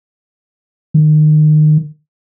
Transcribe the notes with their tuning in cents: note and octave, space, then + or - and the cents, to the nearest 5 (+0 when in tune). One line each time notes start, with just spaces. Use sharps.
D#3 -30